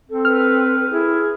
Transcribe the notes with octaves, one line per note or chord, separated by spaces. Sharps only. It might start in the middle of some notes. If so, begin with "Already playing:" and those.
C4 A4
B4 F6
E4 G#4